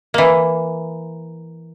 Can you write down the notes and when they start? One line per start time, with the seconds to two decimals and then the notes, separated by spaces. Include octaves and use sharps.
0.14 E3 A#3